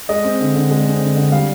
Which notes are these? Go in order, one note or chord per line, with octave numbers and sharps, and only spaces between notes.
G#3 D#5
C4
D3
D3
G#3
C4
D3
D3
G3 F5